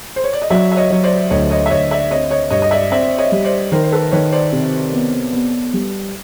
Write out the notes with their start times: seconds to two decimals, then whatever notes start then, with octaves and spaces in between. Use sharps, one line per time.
0.16 C5
0.24 C#5
0.33 D5
0.42 D#5
0.50 F#3 D5 E5
0.72 E5
0.76 C#5 D#5
0.90 F#3 C#5
1.03 C5 D5
1.30 D2 C#5 D#5
1.51 C#5 D#5
1.66 E5
1.70 D2 C#5 D#5
1.91 D5 E5
2.10 C4 C#5 D#5
2.30 C#5 D#5
2.51 G2 C#5 D#5
2.62 D#5
2.71 D5 E5
2.91 C4 D5 E5
3.18 C#5 D#5
3.32 G3
3.44 C5 D5
3.72 D#3 A#4 C5
3.83 C5
3.92 A4 B4
4.11 D#3 B4 C#5
4.32 C5 D5
4.52 C3
4.92 B3
5.32 B3
5.73 G3